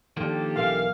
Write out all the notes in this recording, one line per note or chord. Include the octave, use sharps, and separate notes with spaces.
D#3 F3 A#3 D4 G4 A4
B1 E3 A#4 F5